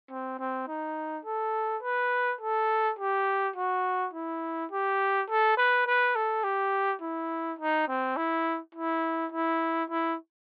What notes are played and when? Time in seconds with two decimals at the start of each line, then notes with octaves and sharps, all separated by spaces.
0.11 C4
0.39 C4
0.68 D#4
1.25 A4
1.83 B4
2.41 A4
2.99 G4
3.56 F#4
4.13 E4
4.71 G4
5.29 A4
5.57 B4
5.87 B4
6.15 A4
6.44 G4
7.01 E4
7.59 D#4
7.88 C4
8.17 E4
8.75 E4
9.32 E4
9.90 E4